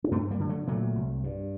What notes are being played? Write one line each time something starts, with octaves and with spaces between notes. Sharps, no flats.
D4
G2 A3 C4
G3 A#3
D3
F#3 A3
A#2 F#3 A3
C2
G2